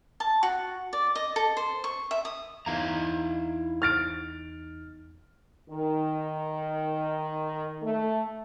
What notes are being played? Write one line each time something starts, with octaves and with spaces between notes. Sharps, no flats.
A5
F#4
D5
D#5
A4
C5
C#6
E5
D#6
E2 D#4 E4 F5 A#5
F6 A6 D7
D#3
A3